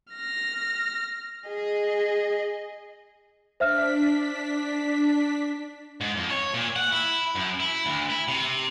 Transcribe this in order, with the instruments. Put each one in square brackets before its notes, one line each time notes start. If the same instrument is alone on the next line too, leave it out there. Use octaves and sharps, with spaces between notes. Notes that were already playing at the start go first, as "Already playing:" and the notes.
[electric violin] F6 A#6
G#4 D#5
[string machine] D4 B6 [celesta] C5 E5 F6
[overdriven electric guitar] G#2
F2
C#5
A#2
F#5
E4
F#2
E4
D2
E4
C3